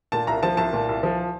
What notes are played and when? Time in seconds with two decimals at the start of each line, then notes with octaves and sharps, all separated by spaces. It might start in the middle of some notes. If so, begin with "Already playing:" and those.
0.12 A#2 A5
0.27 C2 A#5
0.43 F3 A5
0.57 C2 A5
0.73 A#2
0.89 C2
1.03 F3